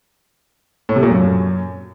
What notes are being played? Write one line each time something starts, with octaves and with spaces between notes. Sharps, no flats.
A2
C3
A#2
F#2